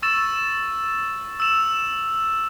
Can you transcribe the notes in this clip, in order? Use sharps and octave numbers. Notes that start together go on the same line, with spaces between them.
C#6 E6 A6 E7
E6 E7 F7